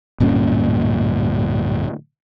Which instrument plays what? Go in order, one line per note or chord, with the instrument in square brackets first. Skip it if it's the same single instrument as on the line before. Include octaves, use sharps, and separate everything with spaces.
[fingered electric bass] D1 G2 A#2 C#4